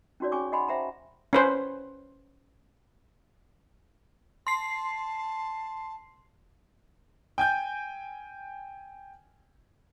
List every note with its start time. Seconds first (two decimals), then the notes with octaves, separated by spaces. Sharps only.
0.20 C#4 D#4 F#4 C#5 D5
0.32 C#4 G#4 C#5 G#5 C#6 D6
0.52 D#5 F#5 G#5 B5 C6
0.68 C5 E5 F#5 G5 A#5 B5
1.33 C#4 B4 C5
4.47 A5 C6 C7
7.38 G5 G#5 G6